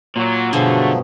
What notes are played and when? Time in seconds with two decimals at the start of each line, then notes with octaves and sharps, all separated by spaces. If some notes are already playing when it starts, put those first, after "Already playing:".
0.16 A#2 F#3
0.53 G2 B2 D3 F3 F#3 A3 G#4